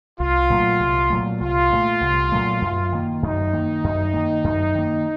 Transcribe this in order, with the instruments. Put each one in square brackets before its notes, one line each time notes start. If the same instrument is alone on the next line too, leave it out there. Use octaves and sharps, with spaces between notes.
[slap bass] C2 [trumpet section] F4
[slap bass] A#2 F#3 A3
C2
A#2 F#3 A3
[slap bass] C2 [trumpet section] F4
[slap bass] A#2 F#3 A3
C2
A#2 F#3 A3
F#2
D#3 A#3
[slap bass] F#2 [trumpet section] D#4
[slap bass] D#3 A#3
F#2
D#3 A#3
F#2
D#3 A#3